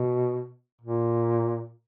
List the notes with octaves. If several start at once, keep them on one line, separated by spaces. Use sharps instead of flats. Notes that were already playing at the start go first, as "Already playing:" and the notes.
Already playing: B2
A#2